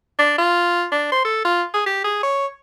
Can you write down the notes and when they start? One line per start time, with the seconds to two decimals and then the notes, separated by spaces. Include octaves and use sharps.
0.18 D4
0.38 F4
0.92 D4
1.12 C5
1.25 A4
1.45 F4
1.74 G#4
1.86 G4
2.04 G#4
2.23 C#5